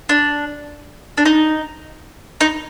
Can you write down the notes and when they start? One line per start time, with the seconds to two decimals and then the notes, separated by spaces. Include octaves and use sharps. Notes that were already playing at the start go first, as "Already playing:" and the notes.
0.09 D4
1.17 D4
1.25 D#4
2.41 D#4